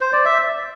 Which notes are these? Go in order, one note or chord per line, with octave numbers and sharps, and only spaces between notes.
C5
D5
E5